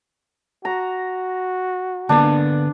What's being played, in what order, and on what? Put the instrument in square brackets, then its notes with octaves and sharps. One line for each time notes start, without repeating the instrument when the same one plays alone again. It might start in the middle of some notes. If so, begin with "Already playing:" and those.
[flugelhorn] F#4 [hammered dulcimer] A#5
[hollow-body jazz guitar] D3 A#3 B3 [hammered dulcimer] D4